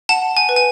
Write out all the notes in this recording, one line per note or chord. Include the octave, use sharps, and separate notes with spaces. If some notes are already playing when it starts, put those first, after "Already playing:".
F#5 A5
G#5
B4
G#5